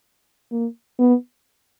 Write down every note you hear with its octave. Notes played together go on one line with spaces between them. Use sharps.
A#3
B3